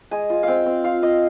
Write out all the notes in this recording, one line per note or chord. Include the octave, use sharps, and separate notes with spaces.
G#3 G#5
F4
C4 F5 G5
C4
F4 F5
F4 D#5